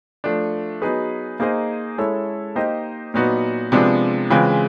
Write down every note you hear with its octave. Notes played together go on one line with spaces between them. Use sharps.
F3 A3 D4
F#3 B3 D#4 G#4 B4
A#3 D#4 G#4 C5 D#5
G#3 C#4 E4 A4 C#5
A#3 D#4 G4 C5 D#5
A#2 F#3 B3 D#4 F#4
C3 F3 G#3 B3 D4
C#3 E3 G#3 C4 F4